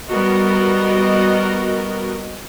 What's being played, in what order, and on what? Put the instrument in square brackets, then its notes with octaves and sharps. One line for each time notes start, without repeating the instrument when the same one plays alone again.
[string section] G3 B3 F#4 A#4 D#5